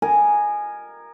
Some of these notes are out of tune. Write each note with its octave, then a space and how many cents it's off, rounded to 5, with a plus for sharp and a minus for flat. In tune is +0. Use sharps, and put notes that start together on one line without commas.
A#4 +0 D#5 -30 G#5 +0